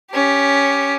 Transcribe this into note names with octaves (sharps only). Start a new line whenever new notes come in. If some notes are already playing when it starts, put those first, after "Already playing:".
C#4 G4